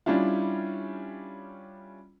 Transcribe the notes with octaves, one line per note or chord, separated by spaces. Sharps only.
G3 C#4 D4 E4 F4